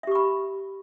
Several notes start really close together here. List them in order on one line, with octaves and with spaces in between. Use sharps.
E5 G4 C#6 B5